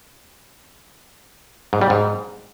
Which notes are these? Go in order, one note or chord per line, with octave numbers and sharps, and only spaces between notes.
G#2
G3
G#2